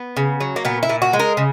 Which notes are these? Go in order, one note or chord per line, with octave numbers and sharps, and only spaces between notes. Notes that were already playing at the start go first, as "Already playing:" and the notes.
Already playing: B3
C#3
F#3
A#3
A#2 B3
E4
A#2
F#4
G#3
A#4
C#3